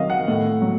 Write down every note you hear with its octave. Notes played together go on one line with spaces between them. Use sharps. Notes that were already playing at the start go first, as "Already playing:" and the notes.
Already playing: C3 D#3 F#3 D#5 F5
F#5
A2
F#3